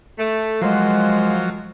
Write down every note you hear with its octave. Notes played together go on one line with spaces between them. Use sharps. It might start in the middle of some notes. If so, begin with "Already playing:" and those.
A3
F3 F#3 G#3 A#3 C5 F#5